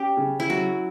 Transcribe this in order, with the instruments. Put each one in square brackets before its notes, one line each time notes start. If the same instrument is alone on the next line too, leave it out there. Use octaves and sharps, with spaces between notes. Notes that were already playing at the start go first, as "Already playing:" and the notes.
Already playing: [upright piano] C#4 [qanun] G4
[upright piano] C#3
[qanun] E4
[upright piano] F#3 [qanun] F#4